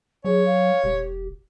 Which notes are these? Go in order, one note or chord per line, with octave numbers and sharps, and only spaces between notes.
F#3 G#4 C#5
F5
E1 G4